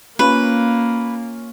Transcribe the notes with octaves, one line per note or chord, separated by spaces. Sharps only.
A#3 C#4 F4 B4